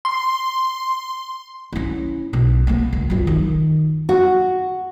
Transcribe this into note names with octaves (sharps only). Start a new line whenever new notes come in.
C6
C#4 E4
B1 B2
A#3 B3
C#2
F#2 F4
D#3
F#4